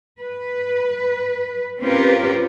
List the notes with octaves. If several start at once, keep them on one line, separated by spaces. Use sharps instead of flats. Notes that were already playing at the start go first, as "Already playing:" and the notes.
B4
C4 C#4 F4 G4 A#4 B4